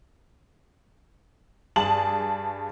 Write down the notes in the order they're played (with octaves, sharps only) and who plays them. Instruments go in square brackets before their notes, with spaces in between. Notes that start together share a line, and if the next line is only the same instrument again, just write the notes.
[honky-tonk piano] G2 G#4 A5 F#7